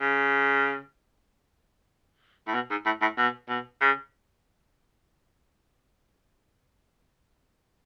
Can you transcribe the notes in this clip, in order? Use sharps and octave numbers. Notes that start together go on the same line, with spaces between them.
C#3
A2
B2
G#2
A2
A2
B2
B2
C#3